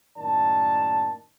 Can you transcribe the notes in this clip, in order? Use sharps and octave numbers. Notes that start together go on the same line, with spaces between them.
F#2 A2 D#3 A#3 D5 A5